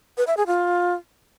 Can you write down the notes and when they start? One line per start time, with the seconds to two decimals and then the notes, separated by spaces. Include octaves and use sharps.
0.17 B4
0.27 E5
0.37 G#4
0.47 F4